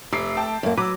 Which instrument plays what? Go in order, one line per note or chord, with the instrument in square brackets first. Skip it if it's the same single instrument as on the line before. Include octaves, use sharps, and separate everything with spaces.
[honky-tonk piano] F1 C7 [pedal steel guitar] A3 E5 D6
[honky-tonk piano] G5 A5
[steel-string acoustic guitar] F#2 A#3
[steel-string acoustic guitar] F#3 [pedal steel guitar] B4 E6 [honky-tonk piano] D6